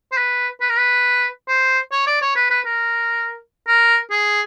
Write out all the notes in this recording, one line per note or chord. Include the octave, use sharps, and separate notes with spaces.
C5
B4
B4
A#4
B4
C5
C#5
D5
C#5
B4
B4
A#4
A#4
G#4